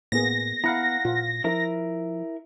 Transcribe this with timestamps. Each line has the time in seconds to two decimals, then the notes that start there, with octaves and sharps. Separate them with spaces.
0.12 A2 A#3 B3 G#4 A#6
0.64 B3 E4 F5 F#5 A#5 B5
1.05 A#2 F4
1.44 F3 E4 A#4